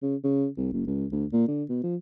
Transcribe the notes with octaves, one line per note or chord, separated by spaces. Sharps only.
C#3
C#3
C2
F#1
C#2
D2
A#2
D3
B2
F3